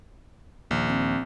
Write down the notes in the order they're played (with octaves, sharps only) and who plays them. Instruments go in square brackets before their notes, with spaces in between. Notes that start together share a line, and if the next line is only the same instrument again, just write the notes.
[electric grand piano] A#1 [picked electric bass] D#2
[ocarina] C4